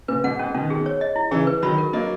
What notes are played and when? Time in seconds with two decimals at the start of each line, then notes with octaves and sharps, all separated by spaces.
0.08 A#2 C#3 B4
0.24 G#2 B2 F#5
0.39 G#2 C#4
0.54 B2 D#3 C#4
0.70 G#4
0.86 C#5
1.01 D#5
1.16 E4
1.31 C#3 E3 G#4
1.47 B4
1.62 D#3 F#3 B5
1.78 A#4
1.93 F#3 A#3 D#5